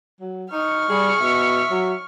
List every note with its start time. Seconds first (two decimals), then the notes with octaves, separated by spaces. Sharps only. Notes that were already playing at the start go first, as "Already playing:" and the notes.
0.20 F#3
0.52 D#4 C#6 F6
0.89 G3 G#4
1.21 B2 E5
1.70 F#3